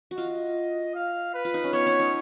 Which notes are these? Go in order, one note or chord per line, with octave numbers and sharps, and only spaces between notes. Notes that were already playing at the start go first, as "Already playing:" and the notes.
F#4
F4 D#5
F5
B4
F4
D#4
C#4
B3 C#5
C#4
D#4